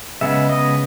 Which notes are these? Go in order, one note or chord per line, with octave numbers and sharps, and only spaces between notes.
C#3 G#3 B3 E5
D#5